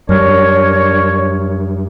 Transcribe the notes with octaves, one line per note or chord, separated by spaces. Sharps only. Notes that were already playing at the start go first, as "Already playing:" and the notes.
F#2 G3 D4 A#4 C#5